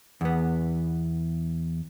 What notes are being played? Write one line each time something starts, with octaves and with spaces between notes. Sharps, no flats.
E2 B3